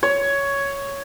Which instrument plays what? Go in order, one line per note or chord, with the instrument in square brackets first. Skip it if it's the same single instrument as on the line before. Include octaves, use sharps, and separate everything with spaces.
[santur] C#5